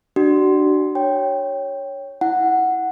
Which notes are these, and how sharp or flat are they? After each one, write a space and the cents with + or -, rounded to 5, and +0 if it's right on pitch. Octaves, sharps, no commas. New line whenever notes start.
D4 +15 F#4 +30
C#5 +0 G5 +0
E4 -20 F#5 +0